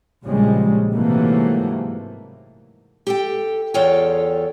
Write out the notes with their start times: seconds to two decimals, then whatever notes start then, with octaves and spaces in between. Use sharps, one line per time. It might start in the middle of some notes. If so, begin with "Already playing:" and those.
0.24 A#1 A#2 C#3 F3 G3 G#3
0.93 G#2 C3 E3 F#3 A3 A#3
3.07 G4 A4 G5
3.74 E2 F4 A4 C#5 G5